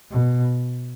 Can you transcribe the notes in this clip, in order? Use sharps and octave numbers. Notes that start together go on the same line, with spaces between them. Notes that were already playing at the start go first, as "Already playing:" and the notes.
B2